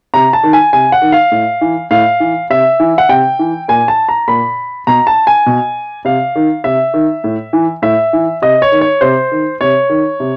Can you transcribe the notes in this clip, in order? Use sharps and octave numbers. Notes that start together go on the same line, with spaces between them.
C3 A#5
A5
D#3
G#5
C3 G#5
F#5
D#3
F5
A2
E3
A2 F5
E3
C3 E5
E3
F#5
C3 G5
E3
A#2 G#5
A5
A#5
A#2 B5
B2 A#5
A5
G#5
B2
C3 F5
D#3
C3 E5
D#3
A2
E3
A2 E5
E3
C3 D#5
C#5
D#3
C#5
C3 C5
D#3
C3 C#5
D#3
C3